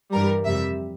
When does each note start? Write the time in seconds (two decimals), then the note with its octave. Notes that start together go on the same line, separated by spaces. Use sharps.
0.12 G2 E3 G3 A#4
0.45 F2 C3 G3 E5